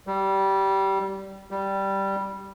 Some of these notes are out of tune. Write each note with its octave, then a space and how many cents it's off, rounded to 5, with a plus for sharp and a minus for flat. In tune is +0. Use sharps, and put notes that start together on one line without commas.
G3 -15
G3 -5